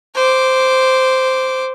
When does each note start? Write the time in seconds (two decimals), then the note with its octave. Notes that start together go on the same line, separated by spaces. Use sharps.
0.15 C5 D6